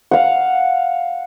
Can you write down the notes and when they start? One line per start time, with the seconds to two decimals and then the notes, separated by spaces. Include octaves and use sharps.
0.11 F5 F#5